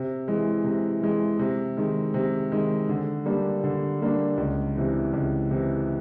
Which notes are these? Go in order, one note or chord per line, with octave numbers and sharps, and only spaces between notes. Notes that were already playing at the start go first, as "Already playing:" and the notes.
Already playing: C3
E3 G#3
C3
E3 G#3
C3
D#3 G#3
C3
D#3 G#3
D3
G3 A#3 D4
D3
G3 A#3 D4
C#2
C3 E3
C#2
C3 E3